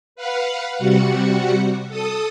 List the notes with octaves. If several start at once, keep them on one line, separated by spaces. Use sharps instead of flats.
B4 F5 F#5
C3 G3 F#4 F#5
A4 D#6